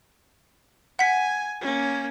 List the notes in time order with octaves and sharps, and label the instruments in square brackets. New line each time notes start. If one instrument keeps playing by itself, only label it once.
[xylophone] F#5 B6 [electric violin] G#5
[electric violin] A#3 C#4